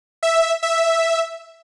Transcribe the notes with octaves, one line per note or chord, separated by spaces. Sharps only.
E5
E5